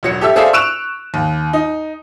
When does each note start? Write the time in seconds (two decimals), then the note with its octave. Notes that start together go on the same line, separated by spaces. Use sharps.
0.03 E1 F#3 C#7
0.21 G4 A4 E5 E6
0.36 G#4 A4 C5 D5 E5 F5
0.53 C#6 E6 F#6 D7 E7 F7
1.14 D#2
1.53 D#4